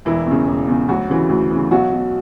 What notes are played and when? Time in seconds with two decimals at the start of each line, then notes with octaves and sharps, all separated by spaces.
0.05 E1 E3 E4
0.26 E2 C#3
0.47 E1
0.68 E2 C#3
0.88 D2 F#3 F#4
1.09 C#3 E3
1.29 D2
1.50 C#3 E3
1.71 B1 F#3 F#4
1.92 B2